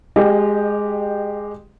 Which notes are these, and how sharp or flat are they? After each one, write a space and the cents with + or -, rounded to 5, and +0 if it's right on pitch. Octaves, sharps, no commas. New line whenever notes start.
G#3 +0 G4 +0 D#5 -35